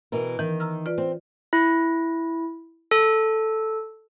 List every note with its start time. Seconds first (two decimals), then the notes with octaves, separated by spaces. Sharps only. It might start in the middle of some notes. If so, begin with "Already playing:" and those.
0.12 B2 E3 A#4
0.39 D#3 E3
0.60 A#5 E6 F6
0.86 F4 B4 D5
0.98 C4
1.53 E4
2.91 A4